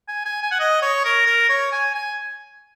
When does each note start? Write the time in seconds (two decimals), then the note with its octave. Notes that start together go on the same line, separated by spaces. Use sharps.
0.08 G#5
0.25 G#5
0.43 G#5
0.51 F#5
0.60 D#5
0.82 C#5
1.05 A#4
1.26 A#4
1.49 C#5
1.72 G#5
1.94 G#5